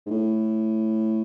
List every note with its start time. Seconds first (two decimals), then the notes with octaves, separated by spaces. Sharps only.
0.06 G#2
0.11 A2